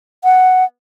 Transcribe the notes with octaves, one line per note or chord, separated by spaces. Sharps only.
F#5